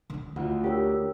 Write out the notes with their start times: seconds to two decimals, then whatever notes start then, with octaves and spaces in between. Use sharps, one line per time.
0.10 D3 C#4
0.36 D2 E4 F4 F#5
0.64 G4 A#4 C#5 E6